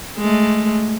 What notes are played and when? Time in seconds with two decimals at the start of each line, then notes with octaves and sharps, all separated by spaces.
0.18 G#3 A3